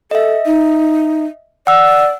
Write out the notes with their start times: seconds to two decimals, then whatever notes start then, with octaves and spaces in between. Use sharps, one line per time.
0.11 A4 D#5 E5
0.46 D#4
1.67 D5 F#5 E6